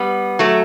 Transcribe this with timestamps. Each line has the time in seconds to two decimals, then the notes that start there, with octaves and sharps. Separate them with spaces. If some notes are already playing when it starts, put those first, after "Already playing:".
Already playing: G3 B3
0.39 F#3 A3